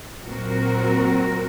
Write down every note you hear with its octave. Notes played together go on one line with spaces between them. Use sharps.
A#2 F#3 C4 F#4 A#4